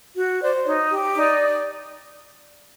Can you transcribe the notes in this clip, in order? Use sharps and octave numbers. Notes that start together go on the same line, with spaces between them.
F#4
C5 D5
D#4 C#5
G4
D#4 D5